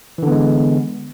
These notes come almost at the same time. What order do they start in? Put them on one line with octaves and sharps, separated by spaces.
E3 D3 B3 G#3